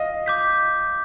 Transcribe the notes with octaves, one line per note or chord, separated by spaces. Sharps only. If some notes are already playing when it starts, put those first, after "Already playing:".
Already playing: D#5 F5
D6 G6 B6